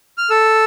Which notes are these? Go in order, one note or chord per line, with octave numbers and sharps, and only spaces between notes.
F6
A4 E6